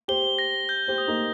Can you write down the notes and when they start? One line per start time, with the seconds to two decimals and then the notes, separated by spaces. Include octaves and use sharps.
0.08 G4 C5 G7
0.39 A#6
0.69 G6
0.88 G4 C5
0.98 D#6
1.07 A#3 D#4